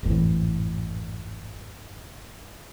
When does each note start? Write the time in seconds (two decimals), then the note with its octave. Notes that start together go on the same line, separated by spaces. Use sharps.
0.03 G#1 F2 A2 E3